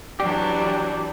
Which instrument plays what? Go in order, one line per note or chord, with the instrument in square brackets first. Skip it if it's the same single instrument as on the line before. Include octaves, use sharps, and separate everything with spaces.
[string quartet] E3 F#3 D4 [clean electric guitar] G4 [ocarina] D5